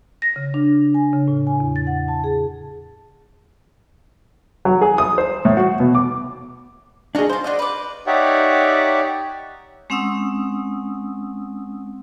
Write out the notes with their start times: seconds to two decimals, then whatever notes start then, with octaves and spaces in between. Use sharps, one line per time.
0.22 A#6
0.36 C#3
0.54 D4
0.94 G#5
1.13 C#3
1.28 A2
1.47 G#5
1.60 E2
1.76 A6
1.87 F#5
2.08 A5
2.24 G#4
4.65 F#3
4.81 G#4
4.98 D#6
5.18 C5
5.45 A2
5.57 F#4
5.80 B2
5.95 D6
7.15 D4 D#4 F#4 G#4 A#4
7.30 E4 F4 C5
7.44 D4 F#4 D#5
7.59 B4 D6
8.07 D#4 G4 C#5 D5 E5 F#5
9.90 G#3 C4 C#4 F#5 D#6 E6